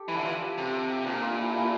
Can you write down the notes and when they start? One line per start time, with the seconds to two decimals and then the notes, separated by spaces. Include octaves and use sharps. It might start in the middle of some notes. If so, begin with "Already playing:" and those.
Already playing: G4 A4
0.08 E3 E4
0.17 D3
0.24 E3 F4
0.41 G4
0.58 C3 A4
0.74 A4
0.90 G4
1.06 A#2 D4
1.23 F4
1.39 E4
1.55 E4